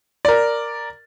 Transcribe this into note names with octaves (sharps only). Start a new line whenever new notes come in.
A#4 D5